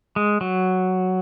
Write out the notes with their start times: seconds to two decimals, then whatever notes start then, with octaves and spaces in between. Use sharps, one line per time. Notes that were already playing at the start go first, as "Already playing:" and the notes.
0.16 G#3
0.41 F#3